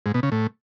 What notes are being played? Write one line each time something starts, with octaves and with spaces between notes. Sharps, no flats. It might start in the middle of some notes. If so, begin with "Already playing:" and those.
G#2
B2
C#3
A2